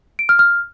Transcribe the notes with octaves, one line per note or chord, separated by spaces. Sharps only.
D7
F6
F6